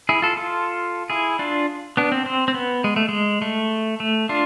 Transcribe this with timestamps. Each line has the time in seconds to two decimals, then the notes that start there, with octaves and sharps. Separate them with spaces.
0.09 E4 G#4
0.22 F4 A4
0.37 F4 A4
1.10 E4 G#4
1.39 D4 F4
1.97 B3 D4
2.12 C4
2.26 C4
2.48 C4
2.54 B3
2.84 G#3
2.96 A3
3.09 G#3
3.42 A3
4.00 A3
4.29 D4 F4